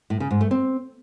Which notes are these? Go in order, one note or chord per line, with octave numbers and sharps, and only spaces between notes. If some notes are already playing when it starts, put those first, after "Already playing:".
A2
C#3
G#2
A3
C4